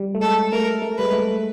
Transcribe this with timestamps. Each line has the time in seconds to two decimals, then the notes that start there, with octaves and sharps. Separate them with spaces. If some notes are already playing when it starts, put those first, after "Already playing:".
Already playing: G3
0.15 A3
0.21 G#3 A4
0.52 A3 A#4
0.82 A3
0.98 G3 B4
1.05 G#3
1.13 A3